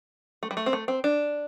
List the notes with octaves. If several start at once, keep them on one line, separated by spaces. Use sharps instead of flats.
A3
G3
A3
C4
A3
C4
D4